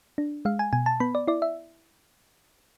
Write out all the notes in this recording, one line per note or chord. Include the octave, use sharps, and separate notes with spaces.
D4
G#3 F5
G#5
B2 G#5
A5
B3 B5
D5
E4 D5
E5